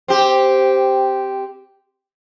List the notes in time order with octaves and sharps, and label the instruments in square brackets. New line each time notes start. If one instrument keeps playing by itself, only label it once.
[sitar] C4 G4